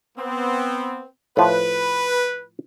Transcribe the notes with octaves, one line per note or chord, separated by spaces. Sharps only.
B3 C4
A2 F3 B4